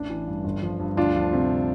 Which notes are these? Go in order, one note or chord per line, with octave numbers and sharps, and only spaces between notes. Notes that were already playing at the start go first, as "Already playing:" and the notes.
Already playing: A1 D4
E3
G2
G1
F3
G2
D2 D4 F4
F3
C3